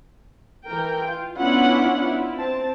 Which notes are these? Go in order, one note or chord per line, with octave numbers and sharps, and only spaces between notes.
E3 A#4 G5
F4
B3 C#4 D4 E4 F4 F#5
E4 F4
C4 A5